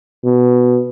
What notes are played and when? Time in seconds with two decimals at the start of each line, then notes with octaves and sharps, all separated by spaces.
0.24 B2